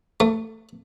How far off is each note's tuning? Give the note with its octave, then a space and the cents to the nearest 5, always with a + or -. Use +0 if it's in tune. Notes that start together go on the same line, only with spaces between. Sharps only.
A3 +20